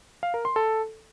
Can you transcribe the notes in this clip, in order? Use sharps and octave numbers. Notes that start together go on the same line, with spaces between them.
F5
A#4
C6
A4